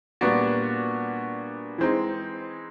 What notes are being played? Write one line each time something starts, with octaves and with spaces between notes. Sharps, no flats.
A#2 G3 B3 D4 F#4
E3 G#3 C4 D#4